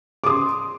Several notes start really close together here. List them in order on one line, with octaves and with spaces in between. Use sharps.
D6 D#6 C6